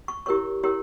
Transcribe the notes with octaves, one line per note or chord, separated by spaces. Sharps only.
C#6
E4 G4 A#4 C#5 C#6
E4 G4 A#4 C#5